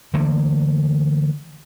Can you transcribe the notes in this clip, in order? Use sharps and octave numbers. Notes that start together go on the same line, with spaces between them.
D3 E3 A3 A#3